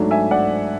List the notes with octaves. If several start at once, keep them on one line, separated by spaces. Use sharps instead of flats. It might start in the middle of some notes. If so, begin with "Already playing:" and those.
Already playing: G#2 F#3 A3 D4
E5 G#5
D5 F#5